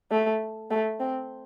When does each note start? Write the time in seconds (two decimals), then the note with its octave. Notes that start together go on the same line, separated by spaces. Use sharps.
0.11 A3
0.70 A3
1.00 C4